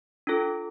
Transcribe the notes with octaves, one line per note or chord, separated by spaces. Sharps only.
D4 F4 A4